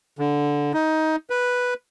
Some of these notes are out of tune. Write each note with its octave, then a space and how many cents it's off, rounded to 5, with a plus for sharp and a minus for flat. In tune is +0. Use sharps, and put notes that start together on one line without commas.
D3 -10
D#4 +15
B4 -5